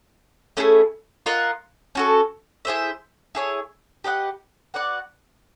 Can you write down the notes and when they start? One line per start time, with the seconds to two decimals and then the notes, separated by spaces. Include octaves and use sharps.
0.57 A3 C#4 E4 G#4
1.26 F4 A#4 D#5 F#5
1.95 C#4 F#4 A4
2.65 E4 G#4 C5 E5
3.35 E4 G#4 C#5
4.04 G4 B4 D#5 F#5
4.74 F#4 B4 D5 F#5